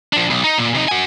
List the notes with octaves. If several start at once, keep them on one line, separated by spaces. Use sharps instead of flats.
F3 D4
B1
D#4
A#2
C3 D#4
F#4 G#5